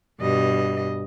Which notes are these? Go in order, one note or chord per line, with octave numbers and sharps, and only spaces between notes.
G2 B2 D#5